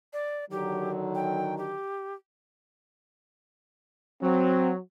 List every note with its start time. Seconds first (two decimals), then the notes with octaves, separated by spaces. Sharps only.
0.13 D5
0.51 D3 D#3 F#3 G4
1.15 G5
1.58 G4
4.22 F#3 C4